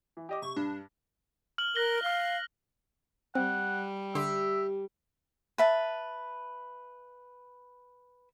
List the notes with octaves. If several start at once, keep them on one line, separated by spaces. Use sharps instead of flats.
E3
G4 D#5 D6
C3 C#6
G2 D4
F6 F#7
A#4 F#6 A#6 G7
F5 F6 G7
G3 C4 F#5
D3 G4 E5 C6
B4 E5 A5